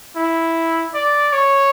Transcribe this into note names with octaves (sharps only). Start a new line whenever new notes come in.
E4
D5
C#5